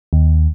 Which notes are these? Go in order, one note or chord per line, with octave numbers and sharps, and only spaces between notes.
D#2